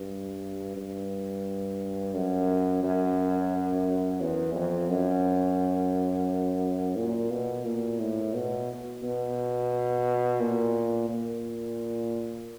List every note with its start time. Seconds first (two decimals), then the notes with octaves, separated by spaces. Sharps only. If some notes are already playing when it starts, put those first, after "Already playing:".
Already playing: G2
0.76 G2
2.14 F#2
2.83 F#2
4.21 E2
4.55 F2
4.89 F#2
6.96 A#2
7.31 B2
7.65 A#2
7.99 A2
8.34 B2
9.03 B2
10.40 A#2
11.09 A#2